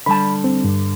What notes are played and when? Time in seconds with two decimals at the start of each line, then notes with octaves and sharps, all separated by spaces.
0.06 D3 G3 A5 B5
0.44 C4
0.64 G2